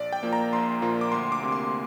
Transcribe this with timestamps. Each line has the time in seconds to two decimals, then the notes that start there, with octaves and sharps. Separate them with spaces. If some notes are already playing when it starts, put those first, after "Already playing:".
Already playing: A#1 D5
0.13 G5
0.23 A#2 F3 A#3
0.33 A#5
0.52 A#1 C6
0.82 A#2 F3 A#3
1.01 D6
1.12 D2 C6
1.32 D6
1.42 C3 A#3
1.52 C6